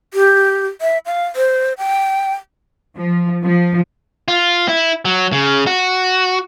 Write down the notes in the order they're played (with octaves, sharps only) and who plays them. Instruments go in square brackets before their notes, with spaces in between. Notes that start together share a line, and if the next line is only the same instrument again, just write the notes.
[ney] G4
E5
F5
C5
G5
[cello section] F3
F3
[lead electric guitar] F4
E4
F#3
C#3
F#4